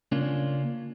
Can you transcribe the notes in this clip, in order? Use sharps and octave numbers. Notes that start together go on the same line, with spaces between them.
C#3 A#3 C#4 D4 F4